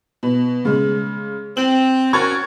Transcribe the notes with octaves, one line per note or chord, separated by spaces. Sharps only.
B2
C#3 G#3
C4 F#7
C#4 F#4 A#4 C#6 G#6 A6